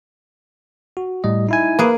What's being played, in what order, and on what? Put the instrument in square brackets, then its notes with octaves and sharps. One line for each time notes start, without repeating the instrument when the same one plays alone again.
[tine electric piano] F#4
A2 G3 D#5
D#4 E4 G#5
[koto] A#3 G#4 [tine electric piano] B4